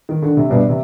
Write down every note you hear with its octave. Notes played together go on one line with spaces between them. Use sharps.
D#3
D3
C3
G2 B2
C3